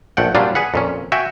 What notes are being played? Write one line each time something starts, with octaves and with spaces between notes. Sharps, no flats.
A#1 A3 F#5 G5
A#2 F#3 G3 D4 F4
G#4 B4 F#5
F2 A#2 C#4
F#4 E5 G5 G#5